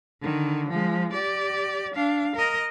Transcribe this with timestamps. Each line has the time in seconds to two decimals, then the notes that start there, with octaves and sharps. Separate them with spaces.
0.21 D3 D#3
0.68 F3 G#3
1.13 G4 D5
1.94 D4 F5
2.35 A#4 D#5